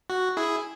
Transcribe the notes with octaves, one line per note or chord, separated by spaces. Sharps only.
F#4
E4 G#4